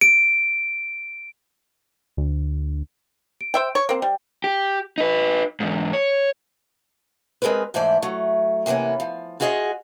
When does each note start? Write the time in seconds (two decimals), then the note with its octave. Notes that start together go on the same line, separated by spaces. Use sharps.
0.01 D7
2.17 D2
3.41 D7
3.54 C5 E5 G5
3.75 C#5
3.89 A#3 C4 C5
4.02 G3 G5
4.44 G4
4.98 D#4 B4
5.60 E2 G#2
5.93 C#5
7.42 G#3 C4 G#4 A#4 B4
7.74 G#2 E3 A3 C5 D5
8.02 F#3 A3
8.66 C3 E3 A#3 B3 C#4
9.00 F3
9.40 F4 F#4 G#4 D#5 F5 F#5